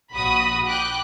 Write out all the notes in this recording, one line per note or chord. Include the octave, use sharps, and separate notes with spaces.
A#1 F#4 B5 D#6
G5 D6 F#6